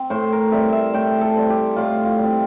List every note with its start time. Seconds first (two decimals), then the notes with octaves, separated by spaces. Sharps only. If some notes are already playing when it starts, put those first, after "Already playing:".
Already playing: C4
0.10 A2 C5
0.32 A#4
0.52 G3 C4 E5
0.73 E5
0.94 A2 G5
1.21 A4
1.36 G3 C4
1.49 G4
1.76 A2 F4
2.05 F4
2.18 G3 C4